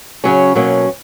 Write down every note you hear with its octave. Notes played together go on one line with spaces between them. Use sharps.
C#3 F#3 C#4
B2 F#3 A#3 C#4